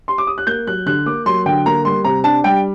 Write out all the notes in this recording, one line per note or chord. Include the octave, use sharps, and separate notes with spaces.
C6
D6
D#6
F#6
A#3 G6
F#3 F#6
D3 F#6
A#3 D6
F#3 C6
D3 G5
A#3 A#5
G3 C6
C3 A#5
D4 A5
G3 G5